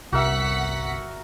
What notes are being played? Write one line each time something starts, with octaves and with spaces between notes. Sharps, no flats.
G1 C2 C3 F#4 A#4 E5 F#5 B6